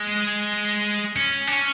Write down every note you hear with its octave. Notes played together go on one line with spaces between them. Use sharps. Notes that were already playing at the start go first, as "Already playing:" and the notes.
Already playing: G#3
C#4
D4
C#4